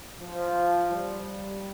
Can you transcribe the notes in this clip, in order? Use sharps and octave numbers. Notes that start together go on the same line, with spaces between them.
F3
G3